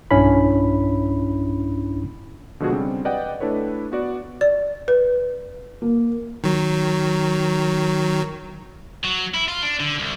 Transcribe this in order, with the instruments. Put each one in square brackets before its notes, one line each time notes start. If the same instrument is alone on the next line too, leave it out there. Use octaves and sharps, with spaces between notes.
[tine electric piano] B1 G2 C#4 D4 E4 B5
[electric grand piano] B2 D3 F3 G#3 F#4 G#4
C#3 G3 C4 D4
B4 D5 D#5 F#5 G5
A3 D4 E4 A4 B4 C#5
B3 F#4 D5
[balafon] D5
B4
[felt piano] A#3
[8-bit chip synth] D#3 F#3
[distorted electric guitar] F#3
E4
F4
D4
D3
C2